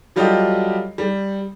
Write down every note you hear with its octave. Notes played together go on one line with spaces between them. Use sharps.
F#3 G3 F4 G4 A4 D#5
G3